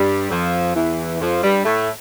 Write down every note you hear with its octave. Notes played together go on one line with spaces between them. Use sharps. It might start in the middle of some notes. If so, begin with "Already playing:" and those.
Already playing: G2 G3
F2 F3
E2 E3
F2 F3
G2 G3
A2 A3